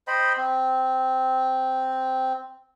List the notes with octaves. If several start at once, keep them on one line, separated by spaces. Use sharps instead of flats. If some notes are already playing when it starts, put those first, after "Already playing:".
C5 D#5 G5 B5
C4